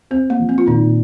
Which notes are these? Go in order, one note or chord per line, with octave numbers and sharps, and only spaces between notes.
C4 C5
A#3
F3
C4
F4
A#2 D#3 D#4